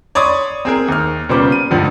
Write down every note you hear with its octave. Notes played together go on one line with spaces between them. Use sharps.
C#5 D5 B5 C6 D#6
C4 G#4 A#4
D#2 F6
A#2 C#3 G3 B3 C5 D6
D#7
C#2 G2 D3 F3